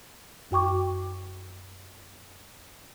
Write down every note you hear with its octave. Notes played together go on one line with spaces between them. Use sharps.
F#2 F#4 G5 C#6 D6